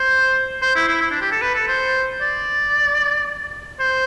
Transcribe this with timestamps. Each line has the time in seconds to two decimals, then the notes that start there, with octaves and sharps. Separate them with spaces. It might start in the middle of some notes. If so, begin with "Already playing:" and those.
Already playing: C5
0.62 C5
0.75 E4
0.88 E4
1.01 E4
1.11 D4
1.21 G4
1.32 A4
1.41 B4
1.55 A4
1.68 C5
2.21 D5
3.80 C5